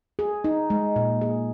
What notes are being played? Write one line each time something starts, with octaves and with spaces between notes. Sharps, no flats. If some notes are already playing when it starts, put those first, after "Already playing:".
G#4
D#4
G#3
A#2
G#4